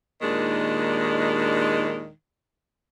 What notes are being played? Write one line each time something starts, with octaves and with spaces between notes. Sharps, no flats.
D#2 A#2 D#3 G#3 D4